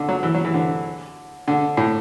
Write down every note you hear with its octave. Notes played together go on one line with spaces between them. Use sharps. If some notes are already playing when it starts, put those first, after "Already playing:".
Already playing: D3
F#3
E3
F#3
E3
D3
D3
A2